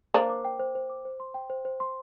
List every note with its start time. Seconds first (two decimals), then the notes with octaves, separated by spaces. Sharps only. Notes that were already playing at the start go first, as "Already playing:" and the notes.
0.14 A#3 D4 C5
0.29 D6
0.45 G5
0.60 C5
0.75 C5
0.90 D6
1.05 C5
1.20 C6
1.34 G5
1.50 C5
1.65 C5
1.80 C6